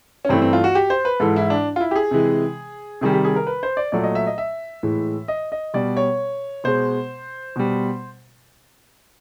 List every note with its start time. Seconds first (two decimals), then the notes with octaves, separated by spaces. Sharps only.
0.25 C#4
0.29 G2 E3 A3 C4
0.42 C4
0.53 F4
0.64 F#4
0.75 G4
0.90 C5
1.05 B4
1.20 G#2 E3 G#3 A4
1.36 E4
1.50 D4
1.76 F4
1.80 E4
1.91 G4
1.96 G#4
2.11 C3 E3 G#3
3.01 C3 D#3 G3 G#4
3.13 G4
3.25 G#4
3.36 A#4
3.47 B4
3.63 C5
3.77 D5
3.92 A#2 F#3 A3 D5
4.04 D#5
4.15 E5
4.27 D#5
4.38 E5
4.83 A2 E3 G#3
5.28 D#5
5.52 D#5
5.74 B2 G3 D5
5.97 C#5
6.64 B2 G#3 C5
7.56 B2 G3